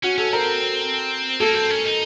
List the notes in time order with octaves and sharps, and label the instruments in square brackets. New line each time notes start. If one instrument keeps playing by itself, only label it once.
[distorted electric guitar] C#4 [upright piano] F#4
[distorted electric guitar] C#4 [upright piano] A4
[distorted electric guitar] C4 [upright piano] A#4
[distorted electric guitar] A#3 [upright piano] A4
[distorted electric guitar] C4
C#4
D#4